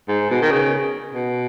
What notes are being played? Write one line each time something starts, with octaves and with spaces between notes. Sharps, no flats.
G#2
B2
D#3
C#3
B2